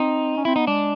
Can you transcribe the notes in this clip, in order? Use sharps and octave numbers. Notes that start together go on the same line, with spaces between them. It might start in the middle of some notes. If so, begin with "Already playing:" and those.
Already playing: C4 D#4
C#4
C4 E4
B3 D#4
G#3 D4